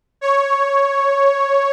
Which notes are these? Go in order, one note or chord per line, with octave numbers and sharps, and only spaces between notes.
C#5